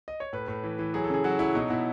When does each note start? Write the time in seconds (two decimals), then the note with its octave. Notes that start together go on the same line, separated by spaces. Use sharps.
0.08 D#5
0.20 C#5
0.33 A2 B4
0.48 A2
0.64 E3
0.79 E3
0.94 F#3 G#4
1.04 A4
1.10 C#3 G#4
1.24 F#3 F#4
1.39 F#3 E4
1.55 B2 D#4
1.70 B2 E4